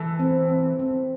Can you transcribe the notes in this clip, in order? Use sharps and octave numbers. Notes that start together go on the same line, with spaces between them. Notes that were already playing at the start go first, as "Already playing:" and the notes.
Already playing: E3 A4
C4
C4
C4